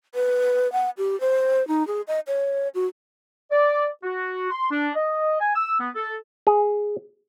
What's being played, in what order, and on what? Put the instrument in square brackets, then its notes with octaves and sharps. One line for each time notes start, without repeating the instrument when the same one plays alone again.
[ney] B4
F#5
G4
C5
D#4
G#4
D#5
C#5
F#4
[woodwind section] D5
F#4
C6
D4
D#5
G#5
E6
B3
A4
[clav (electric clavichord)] G#4